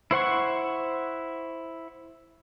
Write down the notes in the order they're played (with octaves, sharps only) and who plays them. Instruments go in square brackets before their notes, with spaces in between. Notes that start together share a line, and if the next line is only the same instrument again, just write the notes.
[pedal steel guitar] E4 C5 F#5 C#6